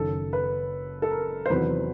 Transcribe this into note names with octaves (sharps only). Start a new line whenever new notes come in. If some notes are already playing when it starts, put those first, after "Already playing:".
Already playing: F#1 F#2 D#3 A4
B4
A4
A#4
C5
E2 C3 D#3 F#3 B4